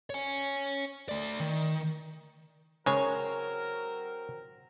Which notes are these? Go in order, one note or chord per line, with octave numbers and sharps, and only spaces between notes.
C#5 G#5
A3 D5
D#3
C#3 F#3 G#3 C4 G#4 A#4 C#5